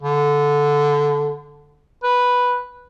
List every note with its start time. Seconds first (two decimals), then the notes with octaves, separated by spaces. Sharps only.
0.02 D3
2.03 B4